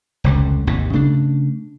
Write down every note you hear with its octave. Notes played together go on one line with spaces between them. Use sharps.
F1 C#2 D3
G#1 D#2 C3
C#3 A3 D4